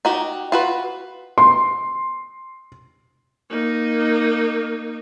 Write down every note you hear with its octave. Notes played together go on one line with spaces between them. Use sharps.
D#4 F#4 G4
F4 F#4 B4
C6
A#3 D#4